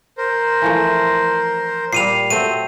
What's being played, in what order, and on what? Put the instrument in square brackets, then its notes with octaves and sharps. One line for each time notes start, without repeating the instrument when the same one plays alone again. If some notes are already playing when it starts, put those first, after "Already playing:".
[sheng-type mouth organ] A#4 C5
[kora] E3 F3 A3
[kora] A#2 G3 [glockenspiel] C7 D#7 F7
[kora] F#3 A3 C4 [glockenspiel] D#7